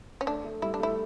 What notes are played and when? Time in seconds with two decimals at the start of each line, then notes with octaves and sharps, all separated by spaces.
0.21 C#4
0.27 A3 D4
0.44 A3
0.62 G3 E4
0.74 D4
0.80 A3
0.83 E4